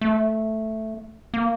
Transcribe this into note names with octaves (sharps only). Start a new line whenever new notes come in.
A3
A#3